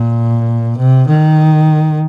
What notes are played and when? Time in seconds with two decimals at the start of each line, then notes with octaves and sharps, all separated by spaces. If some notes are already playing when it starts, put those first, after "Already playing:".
Already playing: A#2
0.77 C3
1.07 D#3